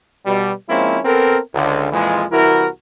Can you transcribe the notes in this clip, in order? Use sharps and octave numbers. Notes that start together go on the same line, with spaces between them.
B2 G3
F3 G#3 A#3 C4 C#4 E4
B3 C4 A4 A#4
C#2 D3
F2 A#2 E3 F3 G#3
C2 E3 E4 F#4 A#4